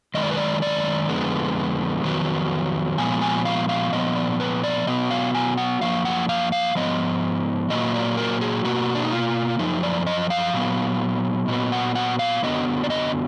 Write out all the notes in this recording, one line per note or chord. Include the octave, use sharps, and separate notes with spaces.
F#2 D#3 G#3 D#5
D5
B4
D5
D5
F2 D3 G#3 B3
F2 D#3 F#3 B3
A#2 F3 G#3 B3 G#5
G#5
F5
F5
A#2 F3 B3 D#5
D5
B4
D5
B2 F#3 B3 D#5
F5
G#5
F#5
F#2 F3 A#3 F5
F#5
F5
F5
G#2 F3 B3 D#5
A#2 F#3 A#3 D#5
D5
A#4
G#4
B2 A#3 F#4
D4
D#4
F4
F#2 F3 D#4
D5
D#5
F5
A#2 F#3 B3
A#2 F#3 B3 D#5
F#5
F#5
F5
F#2 D3 F#3 B3 D#5
D5
D#5